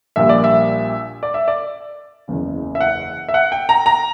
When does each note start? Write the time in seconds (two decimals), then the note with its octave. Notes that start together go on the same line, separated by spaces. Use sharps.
0.16 A#1 A#2 G3 E5
0.29 D5
0.44 E5
1.23 D5
1.34 E5
1.48 D5
2.28 F#1 E2 C#3
2.75 E5
2.80 F#5
3.29 E5
3.34 F#5
3.52 G5
3.69 A#5
3.86 A#5